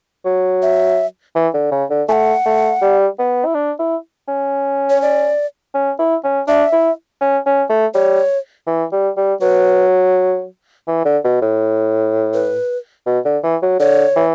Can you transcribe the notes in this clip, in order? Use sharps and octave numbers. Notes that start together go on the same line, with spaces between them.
F#3
E5
E3
D3
C#3
D3
A3 F#5 G#5
A3
G3
B3
E4
D4
E4
C#4
C#5
D5
C#4
E4
C#4
D4 E5
E4
C#4
C#4
A3
G3 C#5
E3
G3
G3
F#3 B4
E3
D3
B2
A2
B4
B2
D3
E3
F#3
D3 C#5
E3